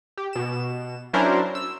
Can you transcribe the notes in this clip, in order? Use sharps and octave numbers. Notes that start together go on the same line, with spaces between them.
G4
B2 E7
F#3 C#4 D4 E4 A#4 C5
E6